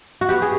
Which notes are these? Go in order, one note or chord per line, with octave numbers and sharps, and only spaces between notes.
F#4
B3 G4
G#4